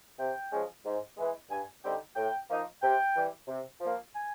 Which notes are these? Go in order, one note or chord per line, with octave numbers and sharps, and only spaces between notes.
C3 G5
F3 G#3 C#4
G#2
E3 G#3
G2 G#5
D3 G3 C4 D#4 G5
A2 G5
F3 A#3 D#4
C3 G5
E3 G3
C3
F3 A#3
G#5